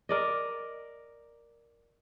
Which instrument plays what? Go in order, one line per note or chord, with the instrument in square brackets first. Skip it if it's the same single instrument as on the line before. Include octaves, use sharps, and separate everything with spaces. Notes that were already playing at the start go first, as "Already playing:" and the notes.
[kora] A#4 D5 D#5